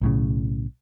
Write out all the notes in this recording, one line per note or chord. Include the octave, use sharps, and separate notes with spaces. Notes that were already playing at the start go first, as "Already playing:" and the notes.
B1 A2 C#3